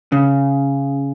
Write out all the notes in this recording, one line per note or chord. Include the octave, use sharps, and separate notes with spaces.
C#3